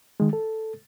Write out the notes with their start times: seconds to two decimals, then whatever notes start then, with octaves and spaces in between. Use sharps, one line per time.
0.20 D#3 G#3
0.33 A4